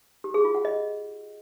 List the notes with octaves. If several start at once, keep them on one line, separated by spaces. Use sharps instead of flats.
G4
G#4
F4
F#5
D#5